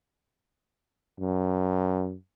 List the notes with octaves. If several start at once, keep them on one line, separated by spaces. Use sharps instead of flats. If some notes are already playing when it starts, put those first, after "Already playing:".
F#2